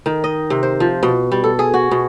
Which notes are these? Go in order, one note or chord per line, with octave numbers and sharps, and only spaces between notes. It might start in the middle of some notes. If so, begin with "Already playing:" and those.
D#3
D#5
C3
C5
F3
B2
G3
A4
G#4
F#4
B2